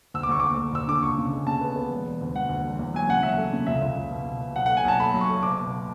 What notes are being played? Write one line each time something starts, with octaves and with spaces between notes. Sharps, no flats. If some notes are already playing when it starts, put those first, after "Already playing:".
D2 E6
D6
D2 C#6
D2 D6
D2
D2 E6
D3 D6
C#2 C#6
C#3
G#3
C#3 A5
B3
B3
E1
E1
D2
E1 F#5
D2
E1
E2
F#3 G#5
C#3 F#5
F#3 E5
A3
C#3
C#2 E5
C#2
C#2
B2
B2
B2
B1 F#5
F#5
A3
G#5
B1 A5
A3 B5
F#3
C#6
A3
F#1 D6
B2